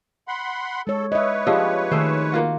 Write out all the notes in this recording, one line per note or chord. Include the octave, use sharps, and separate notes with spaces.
F#5 B5 C6
G#3 A4 C#5
B4 C#5 D#5 E5
F3 C4 D4 G4 G#4 D#5
D#3 G#3 A3 C5
A#3 F4 F#4